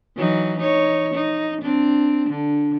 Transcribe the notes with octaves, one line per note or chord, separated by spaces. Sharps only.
E3 F#3 D#4
D#4 C#5
D#4
C4 D4
D3